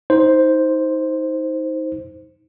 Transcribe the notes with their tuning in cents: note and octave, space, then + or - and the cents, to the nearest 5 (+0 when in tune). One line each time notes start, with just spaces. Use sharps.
D#4 +25 C5 +0